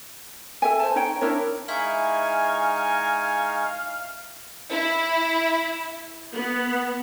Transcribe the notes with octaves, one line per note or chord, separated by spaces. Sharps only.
A4 E5 G#5
C5 A5
D#4 C#5 G5
D4 E4 A#4 C#5
G#3 D#4 E4 F5 G#5 C#6
E4
B3